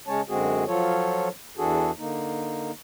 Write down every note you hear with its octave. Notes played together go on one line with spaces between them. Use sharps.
C#3 G#3 C#4 C#5 A5
F#2 D3 G#3 C4 F#4 G#4
F3 F#3 F4 A4 C#5
E2 E3 D4 F#4 G#4 A4
D3 A#3 D#4